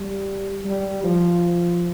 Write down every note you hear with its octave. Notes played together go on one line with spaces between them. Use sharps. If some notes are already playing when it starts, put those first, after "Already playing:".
Already playing: G3
G3
F3